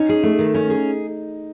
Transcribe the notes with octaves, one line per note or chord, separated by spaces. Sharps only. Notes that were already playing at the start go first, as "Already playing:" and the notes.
Already playing: C#4 D#4
G#4
A3
D#3
C#4
G#4